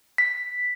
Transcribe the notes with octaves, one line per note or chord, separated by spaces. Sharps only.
B6